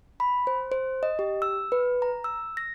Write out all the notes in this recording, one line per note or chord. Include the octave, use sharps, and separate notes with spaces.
B5
C5
C5
D#5
G4
E6
B4
A#5
E6
A#6